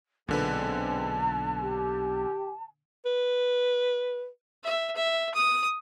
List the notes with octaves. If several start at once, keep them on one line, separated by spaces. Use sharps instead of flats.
B1 E2 A#2 D3 G#3 C4 B4 A5
G4
B4
E5
E5
D#6